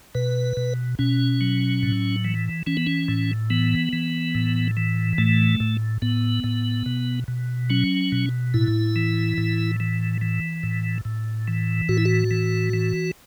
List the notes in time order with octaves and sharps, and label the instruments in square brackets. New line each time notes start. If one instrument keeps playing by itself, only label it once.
[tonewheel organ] B2 B4
B2
B2 C#4
F#3
A2
E3
E3 C#4
B3
C#4
A2
E3 B3
E3
A2
E3
A2 A3
A2
A2 B3
A2
B2
B2
F#3 C#4
B2
A2 E4
E3
A2
E3
E3
A2
A2
E3
A2 F#4
E4
F#4
E3
E3